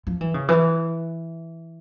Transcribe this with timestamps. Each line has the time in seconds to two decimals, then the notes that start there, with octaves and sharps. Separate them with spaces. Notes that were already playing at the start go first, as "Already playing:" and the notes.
0.07 F3
0.21 E3
0.34 C#3
0.49 E3